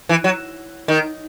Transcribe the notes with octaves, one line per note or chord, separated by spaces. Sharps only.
E3
F#3
D#3